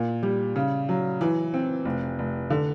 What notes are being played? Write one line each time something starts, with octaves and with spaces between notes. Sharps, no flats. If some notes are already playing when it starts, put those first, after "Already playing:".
Already playing: A#2
G3
C#3
F#3
E3
C4
F1
F1
D3